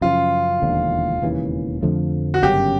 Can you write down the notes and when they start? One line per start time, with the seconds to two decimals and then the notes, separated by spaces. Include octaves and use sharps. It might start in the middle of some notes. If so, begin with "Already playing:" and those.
0.01 F#2 C#3 F3 F4
0.62 E1 D#2 D3 F3
1.22 E1 D#2 C#3 E3
1.83 F2 D3 F3 A3
2.34 F#4
2.42 G1 F#2 C#3 G4